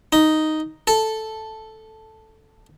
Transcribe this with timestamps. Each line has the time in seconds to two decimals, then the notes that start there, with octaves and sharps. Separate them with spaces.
0.13 D#4
0.87 A4